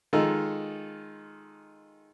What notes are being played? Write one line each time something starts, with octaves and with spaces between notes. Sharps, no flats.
D#3 G#3 D#4 F4 A4